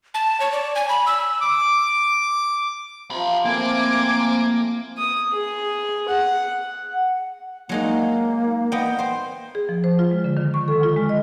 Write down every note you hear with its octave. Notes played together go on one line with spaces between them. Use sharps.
A5
C#5
D5
G#5
B5
E6
D6
C3 F3 A#5 B5
A2 A#3 C4 A4 A#4 F5 G#5 D6
D#6
G#4
F#5
F#5
F#3 G#3 A#3 D#4
B3 D#5 G5
C5 G5
G#4
F3
C5
F4
G#3
D3
D#3
C#6
A4
F4
G#3
D#5